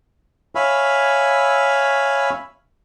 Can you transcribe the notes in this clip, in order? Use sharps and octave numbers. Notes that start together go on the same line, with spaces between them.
C#5 E5 F5 G#5 B5